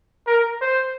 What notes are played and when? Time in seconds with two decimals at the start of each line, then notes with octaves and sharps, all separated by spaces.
0.27 A#4
0.62 C5